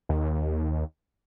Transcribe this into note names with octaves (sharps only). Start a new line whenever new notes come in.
D#2